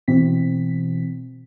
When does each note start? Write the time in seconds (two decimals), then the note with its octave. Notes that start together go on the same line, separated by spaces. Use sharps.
0.08 B2 E3 C4 B6